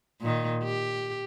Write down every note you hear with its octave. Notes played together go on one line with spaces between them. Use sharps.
A#2 D#3
G4